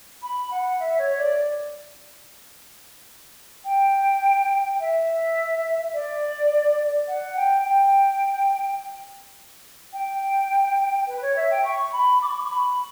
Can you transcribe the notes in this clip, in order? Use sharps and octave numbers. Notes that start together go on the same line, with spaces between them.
B5
F#5
E5
C#5
D5
G5
E5
D5
F#5
G5
G5
G5
B4
C#5
E5
G5
C#6
B5
D6
C#6
B5